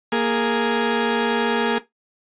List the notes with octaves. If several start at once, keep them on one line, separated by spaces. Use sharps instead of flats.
A#3 G#4